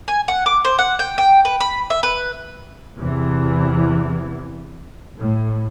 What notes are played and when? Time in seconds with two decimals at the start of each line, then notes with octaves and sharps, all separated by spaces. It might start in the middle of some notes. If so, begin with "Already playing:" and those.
0.08 G#5
0.28 F#5
0.46 D6
0.65 C5
0.78 F#5
0.99 G5
1.18 G5
1.45 B4
1.60 B5
1.90 E5
2.03 B4
2.99 E2 C3 E3
5.19 A2